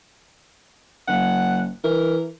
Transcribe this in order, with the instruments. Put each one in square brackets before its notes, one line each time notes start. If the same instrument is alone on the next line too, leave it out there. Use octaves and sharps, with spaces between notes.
[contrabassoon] F#1 [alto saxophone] F#5
[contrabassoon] E3 [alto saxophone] A#4